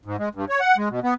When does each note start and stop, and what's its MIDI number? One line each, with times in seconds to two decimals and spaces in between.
0.05 0.16 44
0.19 0.29 56
0.35 0.45 43
0.49 0.60 73
0.60 0.77 78
0.77 0.89 56
0.90 1.00 47
1.03 1.14 59